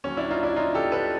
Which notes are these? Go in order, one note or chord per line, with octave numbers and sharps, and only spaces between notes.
D#2 D3 F#3 C#4
D4 E4
D#4 F4
D4 E4
D#4 F4
G4 A4
A4 B4